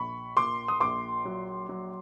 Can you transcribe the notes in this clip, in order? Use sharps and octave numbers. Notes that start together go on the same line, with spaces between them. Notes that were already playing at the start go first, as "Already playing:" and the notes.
Already playing: A#1 B5 C#6
A#2 C6 D6
D#6
A#1 C6 D6
F#3
F#3